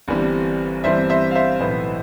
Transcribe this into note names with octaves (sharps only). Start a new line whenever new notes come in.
G1 G2 E3 G3 C4
G1 G2 E3 G3 C4 C5 E5
C5 E5
F5
C5 E5
B1 A2 E3 B3